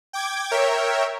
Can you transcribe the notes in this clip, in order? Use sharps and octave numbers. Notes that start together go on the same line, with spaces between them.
G5 D6 G#6
A#4 C#5 E5 G5